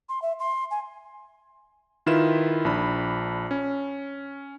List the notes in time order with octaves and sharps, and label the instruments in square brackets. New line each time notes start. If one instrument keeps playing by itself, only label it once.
[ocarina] C6
E5
C6
G#5
[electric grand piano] D#3 E4 F4 B4 E7
A#1 D4 B5
C#4